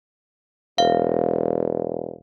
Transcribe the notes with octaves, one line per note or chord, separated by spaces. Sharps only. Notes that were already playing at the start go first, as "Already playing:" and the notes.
E1 F5